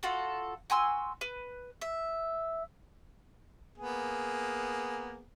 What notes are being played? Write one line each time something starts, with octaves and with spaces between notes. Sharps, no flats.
F4 F#4 A4
F#4 G#5 C6 E6
B4
E5
A#3 B3 G#4